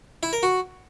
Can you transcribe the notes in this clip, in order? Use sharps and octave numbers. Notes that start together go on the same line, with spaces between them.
E4
A#4
F#4